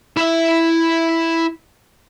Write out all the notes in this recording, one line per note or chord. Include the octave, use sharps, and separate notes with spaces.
E4 E5